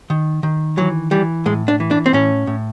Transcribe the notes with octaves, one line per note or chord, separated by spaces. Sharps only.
D#3
D#3
E3 F#3
E3 G3
A2 G#3
D4
E3
D4
C4
A2 C#4
A2